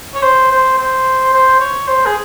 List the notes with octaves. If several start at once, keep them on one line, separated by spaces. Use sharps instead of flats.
C#5
C5
C5
C5
C5
C#5
C5
G#4